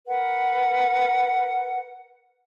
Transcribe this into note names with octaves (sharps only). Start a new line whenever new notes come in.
A#4 B4 F#5